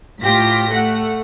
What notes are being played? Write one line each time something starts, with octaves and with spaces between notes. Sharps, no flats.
A2 F4 G4 A#6 B6
A3 F#5